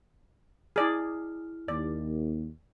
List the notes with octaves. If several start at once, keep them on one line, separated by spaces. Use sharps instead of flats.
E4 G#4 D5 F6
D#2 D5